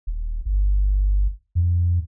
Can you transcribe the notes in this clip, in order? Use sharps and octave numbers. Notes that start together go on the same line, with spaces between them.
D#1
G1
F2